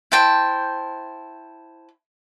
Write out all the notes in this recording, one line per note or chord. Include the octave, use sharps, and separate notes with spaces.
E4 C5 G5 A5